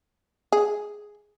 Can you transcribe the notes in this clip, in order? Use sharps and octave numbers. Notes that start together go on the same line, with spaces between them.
G#4